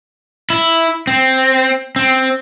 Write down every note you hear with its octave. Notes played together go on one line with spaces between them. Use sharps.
E4
C4
C4